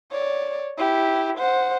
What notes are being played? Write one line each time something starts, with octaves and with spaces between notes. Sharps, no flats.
C#5 D5
E4 G4
C5 F#5